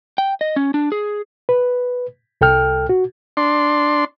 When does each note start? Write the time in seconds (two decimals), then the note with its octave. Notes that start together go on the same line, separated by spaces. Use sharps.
0.18 G5
0.41 D#5
0.56 C#4
0.74 D4
0.92 G#4
1.49 B4
2.41 C2 A4 G5 F6
2.89 F#4
3.37 D4 C6